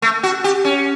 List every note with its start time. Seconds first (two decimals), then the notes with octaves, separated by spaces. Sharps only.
0.02 A3
0.23 F#4
0.44 G4
0.65 C#4